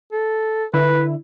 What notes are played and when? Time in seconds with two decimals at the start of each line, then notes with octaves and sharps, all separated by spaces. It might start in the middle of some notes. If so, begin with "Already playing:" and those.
0.12 A4
0.74 D3 E4 B4